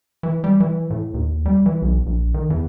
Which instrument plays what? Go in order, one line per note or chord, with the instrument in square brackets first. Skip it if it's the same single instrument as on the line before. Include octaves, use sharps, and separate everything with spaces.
[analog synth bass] E3
G3
E3
A2
D#2
G3
E3
B1
A#1
D#3
E2